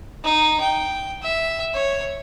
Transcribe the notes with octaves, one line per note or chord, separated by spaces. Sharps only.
D#4
G5
E5
C#5